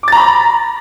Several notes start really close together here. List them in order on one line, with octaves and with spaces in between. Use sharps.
D6 A6 A#5 B5